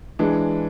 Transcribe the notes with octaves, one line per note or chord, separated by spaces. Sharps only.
E3 G#3 D4